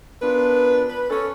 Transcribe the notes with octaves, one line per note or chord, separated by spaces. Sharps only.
B3 D4 F4 A#4 B4
B4
C#4 A4